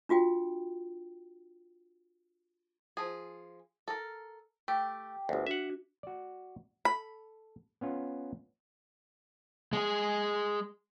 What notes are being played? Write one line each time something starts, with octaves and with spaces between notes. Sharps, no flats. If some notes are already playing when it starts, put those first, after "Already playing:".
D4 F4 F#4 G5
F3 G#4
A4 A#4
A3 G4 G5
G1 D2
D4 F#4 E5 F#5
F#4 D5
A4 B5
B3 C#4 F4
G#3 G#4